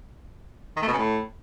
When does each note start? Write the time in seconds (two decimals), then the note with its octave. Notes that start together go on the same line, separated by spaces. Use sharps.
0.76 D#3
0.82 A3
0.87 B2
0.93 C#3
0.98 A2